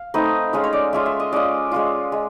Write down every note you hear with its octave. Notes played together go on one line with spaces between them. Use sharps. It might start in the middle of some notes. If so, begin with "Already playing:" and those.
Already playing: F5
A3 C4 D#4 B4
G#3 C#4 F4 C5
C#5
D5
G#3 C#4 F4 E5
E5
D#5
G#3 C#4 F4 D5
G#3 C#4 F4
G#3